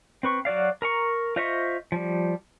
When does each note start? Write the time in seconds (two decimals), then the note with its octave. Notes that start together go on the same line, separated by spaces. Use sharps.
0.23 C4 B4 C#6
0.45 F#3 F#4 D5 F5
0.82 A#4 A#5 C#6
1.36 F4 C5 D#5 E5 C#6
1.92 F3 G3